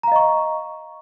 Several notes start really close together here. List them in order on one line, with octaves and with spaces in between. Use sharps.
A#5 F5 D#5 C#6